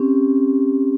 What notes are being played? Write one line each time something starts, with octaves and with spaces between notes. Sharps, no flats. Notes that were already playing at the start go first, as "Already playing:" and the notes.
Already playing: C4 C#4 G4